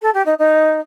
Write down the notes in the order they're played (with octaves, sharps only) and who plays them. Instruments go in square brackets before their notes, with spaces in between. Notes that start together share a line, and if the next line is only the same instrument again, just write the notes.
[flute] A4
G4
D#4
D#4